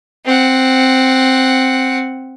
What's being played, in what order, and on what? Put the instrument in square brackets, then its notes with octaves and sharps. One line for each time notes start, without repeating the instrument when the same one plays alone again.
[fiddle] C4 F#5